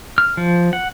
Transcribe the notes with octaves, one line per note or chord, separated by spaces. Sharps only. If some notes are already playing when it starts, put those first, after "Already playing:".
F6
F3
F#5